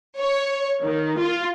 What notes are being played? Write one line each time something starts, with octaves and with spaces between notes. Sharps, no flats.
C#5
D#3
F4